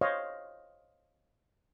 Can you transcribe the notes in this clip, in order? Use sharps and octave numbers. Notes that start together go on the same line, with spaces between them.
C5 C#5 D#5 F5